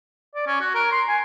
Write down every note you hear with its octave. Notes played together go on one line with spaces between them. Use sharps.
D5
C#4
F#4
A#4
C6
G#5